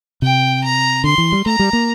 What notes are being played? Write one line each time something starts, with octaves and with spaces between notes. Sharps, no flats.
C3 G5
A#5
D3 C6
E3
G3
A3 A#5
G3
A#3